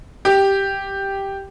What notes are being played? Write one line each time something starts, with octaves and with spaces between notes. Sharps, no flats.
G4